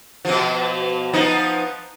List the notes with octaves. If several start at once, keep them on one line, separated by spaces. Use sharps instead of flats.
B2 F3
F3 B3 D#4